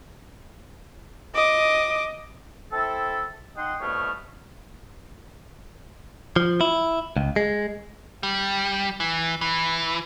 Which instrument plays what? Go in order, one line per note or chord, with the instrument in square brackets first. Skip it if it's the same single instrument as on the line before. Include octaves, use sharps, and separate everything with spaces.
[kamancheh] D#5 D6
[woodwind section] C4 E4 A4
D#4 D#5 F#5 G5 C6
C2 B2 A3 C#5 F6
[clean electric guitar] F3
E4
C#2
G#3
[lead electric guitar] G3
E3
E3